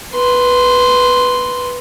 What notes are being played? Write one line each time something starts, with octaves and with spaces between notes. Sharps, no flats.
B4 C6